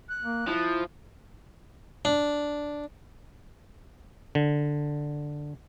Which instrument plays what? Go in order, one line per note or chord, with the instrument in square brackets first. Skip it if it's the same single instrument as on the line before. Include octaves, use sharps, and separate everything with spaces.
[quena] F#6
[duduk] A#3
[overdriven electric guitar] F3 [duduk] E4
[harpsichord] D4
[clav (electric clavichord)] D3